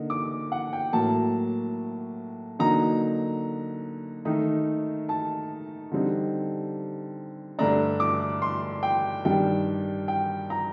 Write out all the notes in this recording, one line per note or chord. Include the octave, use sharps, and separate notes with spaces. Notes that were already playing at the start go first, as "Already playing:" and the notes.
Already playing: D3 A#3 D#4
D6
F#5
G5
A2 F#3 A#3 A5
D3 F#3 A#3 D#4 A#5
D#3 A3 D#4
A5
D3 G3 C4 D#4
G2 D3 A3 D4 A#5
D6
C6
G5
G2 D#3 G3 D4 G5
G5
A#5